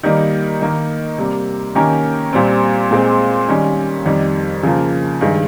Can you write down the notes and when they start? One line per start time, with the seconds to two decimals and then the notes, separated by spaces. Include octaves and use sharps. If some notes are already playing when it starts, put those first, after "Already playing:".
0.04 D#3 G3 A#3 D#4
0.61 D#3 A#3 D#4
1.18 C3 G3 A#3
1.75 D#3 A#3 C#4 G4 A#4
2.33 A#2 G3 C4
2.91 A#2 G#3 C4
3.48 D#3 G3 C#4
4.06 F2 D#3 G3
4.63 C#3 F3 A#3
5.21 G2 D#3 G#3